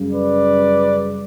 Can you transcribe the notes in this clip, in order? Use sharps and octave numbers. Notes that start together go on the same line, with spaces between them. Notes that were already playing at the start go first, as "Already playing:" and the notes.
Already playing: F#2 C#3 G3
B4 D5